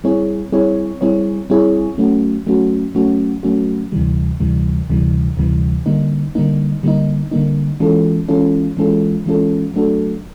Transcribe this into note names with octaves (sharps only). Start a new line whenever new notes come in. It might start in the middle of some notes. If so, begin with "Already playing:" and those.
G3 C4 E4 G#4 C#5
G3 C4 E4 G#4 C#5
G3 C4 E4 G#4 C#5
G3 C4 E4 G#4 C#5
F#3 A3 C#4 F#4
F#3 A3 C#4 F#4
F#3 A3 C#4 F#4
F#3 A3 C#4 F#4
D2 C3 E3 G3
D2 C3 E3 G3
D2 C3 E3 G3
D2 C3 E3 G3
D3 G3 A#3 D#4
D3 G3 A#3 D#4
D3 G3 A#3 D#4
D3 G3 A#3 D#4
E3 G#3 C#4 F4 A4
E3 G#3 C#4 F4 A4
E3 G#3 C#4 F4 A4
E3 G#3 C#4 F4 A4
F#3 A3 D4 F#4 A4